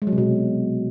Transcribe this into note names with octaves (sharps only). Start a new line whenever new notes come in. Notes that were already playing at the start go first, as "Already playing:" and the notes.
G#3
F#3
C3
B2